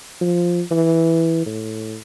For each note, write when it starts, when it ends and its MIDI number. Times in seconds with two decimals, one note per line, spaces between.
0.21 0.62 53
0.71 1.44 52
1.46 1.97 45